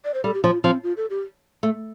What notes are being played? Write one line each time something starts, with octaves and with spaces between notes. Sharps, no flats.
D5
C5
G3 A4
G4
F3 F4
F3 C4
F4
A4
G4
A3